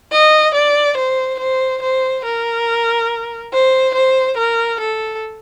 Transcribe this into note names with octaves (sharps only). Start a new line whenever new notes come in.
D#5
D5
C5
C5
C5
A#4
C5
C5
A#4
A4